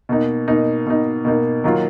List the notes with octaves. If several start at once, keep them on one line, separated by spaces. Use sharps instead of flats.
B2 A#3 D#4
B2 A#3 D#4
B2 A#3 D#4
B2 A#3 D#4
D#3 F#3 A#3 F4